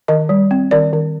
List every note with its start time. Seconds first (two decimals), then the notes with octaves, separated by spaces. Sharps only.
0.08 D#3 D#5
0.29 G3
0.51 C4
0.71 D#3 D5
0.93 D#3